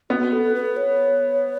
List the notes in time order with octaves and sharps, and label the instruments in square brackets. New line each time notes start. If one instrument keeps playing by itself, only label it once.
[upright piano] B3 [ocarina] F#4
[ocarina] A4
B4
C#5